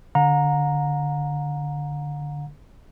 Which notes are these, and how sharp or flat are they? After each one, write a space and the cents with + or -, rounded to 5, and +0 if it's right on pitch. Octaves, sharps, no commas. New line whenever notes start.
D3 -5 F#5 -45 A#5 +0